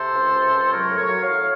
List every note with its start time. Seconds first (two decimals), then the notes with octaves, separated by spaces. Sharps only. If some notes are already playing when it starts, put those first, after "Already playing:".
Already playing: C3 A4 C5
0.13 C#2
0.33 C3
0.51 C#2
0.70 F#3 A#4 C#5
0.89 A2
0.96 A#4 C#5
1.08 F#3
1.21 C#5 F5
1.28 A2